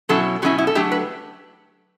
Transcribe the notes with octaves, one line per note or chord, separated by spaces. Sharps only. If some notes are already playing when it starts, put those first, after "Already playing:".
B2 F#3 C#4 E4 A4
B2 F#3 C#4 E4 F#4
E4
A4
F#3 A3 D4 G4
B4